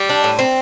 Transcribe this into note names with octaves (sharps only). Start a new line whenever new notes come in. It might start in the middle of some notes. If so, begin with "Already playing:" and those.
Already playing: G3
D4
A2
C4